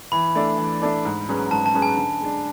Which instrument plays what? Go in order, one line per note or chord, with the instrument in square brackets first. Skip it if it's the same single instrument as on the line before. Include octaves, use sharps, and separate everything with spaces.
[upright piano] E3 [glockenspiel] B5
[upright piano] A3 D4 A4 D5
E3
A3 D4 A4 D5
G#2
F#3 C#4 G#4 B4
[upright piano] G#2 [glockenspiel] A5
[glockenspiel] A5
[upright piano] F#3 C#4 G#4 B4
[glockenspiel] G#5
[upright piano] D3
G#3 D4